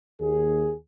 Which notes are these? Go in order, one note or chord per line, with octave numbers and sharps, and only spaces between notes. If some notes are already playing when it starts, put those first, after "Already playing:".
D#2 G#4